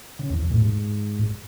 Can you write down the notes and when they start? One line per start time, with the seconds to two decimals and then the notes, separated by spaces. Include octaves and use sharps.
0.19 C#3
0.30 E2
0.41 F2
0.52 A2
0.62 G#2